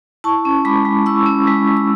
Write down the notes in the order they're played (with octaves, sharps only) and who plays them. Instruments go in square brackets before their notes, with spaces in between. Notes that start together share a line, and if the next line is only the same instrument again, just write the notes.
[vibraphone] E4 A5 C#6
C#4
G#3 B5 D6
G#3
E4 C#6 E6
C#4
G#3
G#3
E6